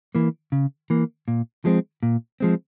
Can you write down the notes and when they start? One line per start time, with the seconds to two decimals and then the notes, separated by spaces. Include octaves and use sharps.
0.15 E3 A#3
0.52 C#3
0.90 E3 A#3
1.28 A#2
1.65 F3 G#3 C4
2.03 A#2
2.40 F3 G#3 C4